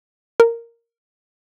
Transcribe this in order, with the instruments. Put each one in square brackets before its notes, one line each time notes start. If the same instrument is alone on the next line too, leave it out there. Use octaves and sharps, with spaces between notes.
[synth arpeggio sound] A#4